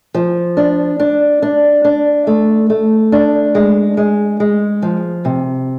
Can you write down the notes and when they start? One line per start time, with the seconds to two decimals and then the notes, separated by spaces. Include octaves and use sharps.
0.14 F3
0.57 D4
1.00 D4
1.42 D4
1.85 D4
2.27 A3
2.70 A3
3.12 D4
3.55 G#3
3.97 G#3
4.40 G#3
4.82 F3
5.25 C3